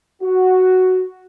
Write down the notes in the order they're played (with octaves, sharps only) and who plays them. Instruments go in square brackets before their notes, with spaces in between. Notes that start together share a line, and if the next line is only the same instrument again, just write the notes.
[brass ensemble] F#4